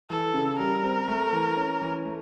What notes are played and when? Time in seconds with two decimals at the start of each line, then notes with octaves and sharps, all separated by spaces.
0.10 E3 A4
0.34 C#3
0.59 G3 A#4
0.83 C4
1.08 A3
1.33 E3
1.57 C#4
1.81 E3
2.05 A3